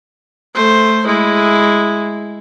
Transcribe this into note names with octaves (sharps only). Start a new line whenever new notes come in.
A3 C5
G#3 E4